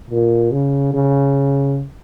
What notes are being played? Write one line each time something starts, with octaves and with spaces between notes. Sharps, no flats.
A#2
C#3
C#3